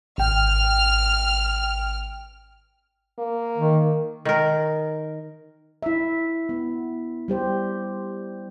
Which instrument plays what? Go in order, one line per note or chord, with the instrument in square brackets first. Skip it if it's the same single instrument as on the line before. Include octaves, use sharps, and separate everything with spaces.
[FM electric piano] G#1 G5 [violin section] F6
[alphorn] A#3
[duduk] D#3
[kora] D#3 A#4
[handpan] E4 E5
B3
G3 G4 C5